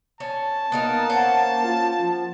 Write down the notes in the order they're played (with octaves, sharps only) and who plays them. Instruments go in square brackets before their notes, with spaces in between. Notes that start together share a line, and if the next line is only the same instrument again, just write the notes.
[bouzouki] C#4 [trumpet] A5
[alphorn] A#3 [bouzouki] B3 D#4 A#4
[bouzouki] C#4 C5 F#5
[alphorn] F4
F3